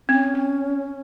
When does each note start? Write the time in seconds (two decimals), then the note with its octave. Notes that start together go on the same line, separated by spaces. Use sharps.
0.09 C4 C#4
0.34 C4